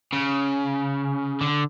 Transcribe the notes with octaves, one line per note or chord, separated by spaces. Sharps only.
C#3
D3